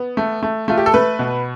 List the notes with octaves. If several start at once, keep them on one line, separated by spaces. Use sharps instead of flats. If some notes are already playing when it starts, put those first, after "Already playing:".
Already playing: B3
A3
A3
A3 F4
G4
A4
A3 B4
B2